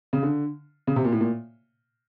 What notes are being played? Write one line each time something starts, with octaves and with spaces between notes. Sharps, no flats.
C#3
D3
C#3
C3
A#2
A2
A#2